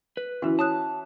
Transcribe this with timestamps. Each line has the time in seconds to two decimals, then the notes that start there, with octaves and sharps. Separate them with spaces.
0.17 B4
0.42 E3 C#4 F#4
0.59 C#5 A5 D#6 F#6